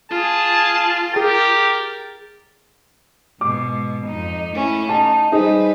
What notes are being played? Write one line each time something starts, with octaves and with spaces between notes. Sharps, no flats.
F4 G#4 A5
G4 G#4 A#4 A6
G#2 B2 D6
F2 D#4
A3 C#4 E4
D#4 A5
G3 D#4 G#4 B4 C5